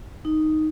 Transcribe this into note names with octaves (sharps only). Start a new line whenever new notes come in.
D#4